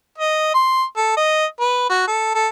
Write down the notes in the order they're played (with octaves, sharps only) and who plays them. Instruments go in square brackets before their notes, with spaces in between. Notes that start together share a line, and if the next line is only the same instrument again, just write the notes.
[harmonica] D#5
C6
A4
D#5
B4
F#4
A4
A4